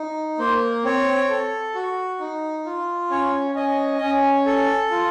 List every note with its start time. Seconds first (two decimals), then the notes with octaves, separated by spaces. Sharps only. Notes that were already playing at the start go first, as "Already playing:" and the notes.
Already playing: D#4
0.39 A#3 C5
0.84 C4 C#5
1.29 A4
1.75 F#4
2.19 D#4
2.66 F4
3.11 C#4 C#5
3.55 C#4 D#5
4.01 C#4
4.46 A4
4.91 F4